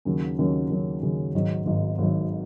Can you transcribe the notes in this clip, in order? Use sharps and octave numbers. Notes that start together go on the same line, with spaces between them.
D#2 C#3 F#3 C#4
D#2 C#3 F#3 C#4
D#2 C#3 F#3 C#4
D#2 C#3 F#3 C#4
G#1 G#2 F#3
G#1 G#2 F#3
G#1 G#2 F#3